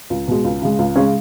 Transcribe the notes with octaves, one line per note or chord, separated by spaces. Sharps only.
C#2
B2 G#3
C#2
C#3 G#3
C#2
C#3 G#3 C#4